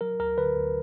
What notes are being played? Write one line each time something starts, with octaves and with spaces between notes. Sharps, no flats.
F#3 A#4
D2 A#4
D3 B4
D2